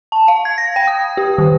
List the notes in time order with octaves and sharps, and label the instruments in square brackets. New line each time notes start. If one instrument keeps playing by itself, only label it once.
[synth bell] A5
F5
G#6
A#6
G5
D#6
G4
D#3